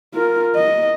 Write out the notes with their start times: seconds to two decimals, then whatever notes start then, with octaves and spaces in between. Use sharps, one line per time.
0.14 F4 A#4
0.55 D#5